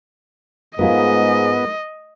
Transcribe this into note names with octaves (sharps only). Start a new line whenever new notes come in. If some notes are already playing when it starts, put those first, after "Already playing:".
G#2 G#3 B3 F4 A#4 D#5